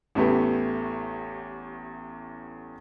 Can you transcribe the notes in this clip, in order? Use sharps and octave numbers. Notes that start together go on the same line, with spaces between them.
A1 E2 A3 B3 G4